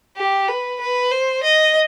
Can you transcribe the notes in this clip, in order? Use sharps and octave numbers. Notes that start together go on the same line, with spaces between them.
G4
B4
B4
C5
D#5